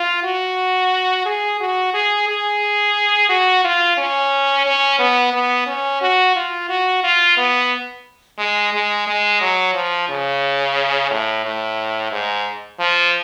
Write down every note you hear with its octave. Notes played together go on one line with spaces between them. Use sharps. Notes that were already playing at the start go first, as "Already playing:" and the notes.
Already playing: F4
F#4
G#4
F#4
G#4
G#4
F#4
F4
C#4
C#4
B3
B3
C#4
F#4
F4
F#4
F4
B3
G#3
G#3
G#3
F#3
F3
C#3
A2
A2
G#2
F3